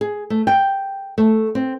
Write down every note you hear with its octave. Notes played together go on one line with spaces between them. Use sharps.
G#4
A3
G5
A3
C4